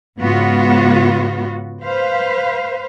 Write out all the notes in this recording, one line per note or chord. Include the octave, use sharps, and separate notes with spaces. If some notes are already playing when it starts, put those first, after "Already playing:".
G#2 C#3 B3 F4 F#4
B4 C5 F5